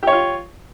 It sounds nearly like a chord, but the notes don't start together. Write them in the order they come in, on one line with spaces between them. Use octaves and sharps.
G4 C#5 F4